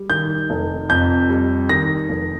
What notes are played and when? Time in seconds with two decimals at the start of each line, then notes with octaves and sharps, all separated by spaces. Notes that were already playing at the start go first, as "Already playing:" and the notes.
Already playing: G3
0.10 D#3 G6
0.50 F1
0.89 F2 G6
1.30 G3
1.69 D#3 A#6
2.09 F1